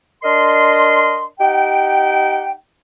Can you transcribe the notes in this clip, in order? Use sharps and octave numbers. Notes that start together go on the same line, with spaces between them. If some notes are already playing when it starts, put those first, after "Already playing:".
D4 A#4 D#5 C6
D#4 G4 F#5 G5